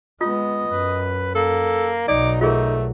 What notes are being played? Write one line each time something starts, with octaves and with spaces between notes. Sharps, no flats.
G#3 B3 F4 D#5
F#2 B4
A#3 A4
B1 F#3 D#4 D5 D6
A3 D#4 F4 G#4 A#4